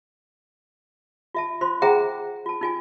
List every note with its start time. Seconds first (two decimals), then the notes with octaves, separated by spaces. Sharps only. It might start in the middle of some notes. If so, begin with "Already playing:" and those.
1.35 F4 E5 A5
1.61 F4 C5 C6
1.82 G#4 C5 E5 F#5 G5 A#5
2.46 F4 A5
2.61 D#4 F4 G#5